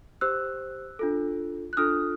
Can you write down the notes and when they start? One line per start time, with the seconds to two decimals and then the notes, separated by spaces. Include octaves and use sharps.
0.21 G4 C5 E6 F#6
0.99 D4 F4 A4
1.73 F#6
1.77 D4 F4 A4 D#6 F6